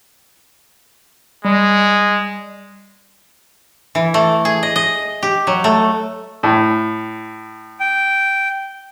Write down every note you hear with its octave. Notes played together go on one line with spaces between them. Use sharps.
G3 G#3
E3
A3
G#4
D#5
D#5
G4
F#3
A3
A2
G5